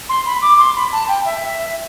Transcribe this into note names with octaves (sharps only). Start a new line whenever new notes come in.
C6
B5
D6
C6
B5
A5
G5
E5
E5